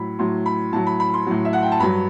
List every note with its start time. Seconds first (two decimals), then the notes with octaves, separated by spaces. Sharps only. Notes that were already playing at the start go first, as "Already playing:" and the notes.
Already playing: A2 F#3 B5
0.19 A2 F#3 C6
0.46 B5
0.73 A2 F#3 A5
0.87 B5
1.00 B5
1.14 C6
1.27 A2 F#3
1.45 E5
1.53 F#5
1.62 G5
1.72 A5
1.80 G2 F#3 B5